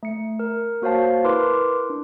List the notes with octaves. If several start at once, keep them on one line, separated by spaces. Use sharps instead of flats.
A3 C#7
A#4
A#3 F#4 C5 C#5 F5 A5
E4 A#4 B4 C6 D6
D4